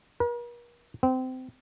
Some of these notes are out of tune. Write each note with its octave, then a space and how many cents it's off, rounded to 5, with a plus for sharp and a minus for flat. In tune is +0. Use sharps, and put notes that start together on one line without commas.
A#4 +45
C4 -25